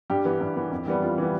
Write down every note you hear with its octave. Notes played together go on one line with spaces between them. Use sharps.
G2 G4
E3 B3
G2
E3 B3
F2
E3 G3 B3
F2 F4
E3 G3 B3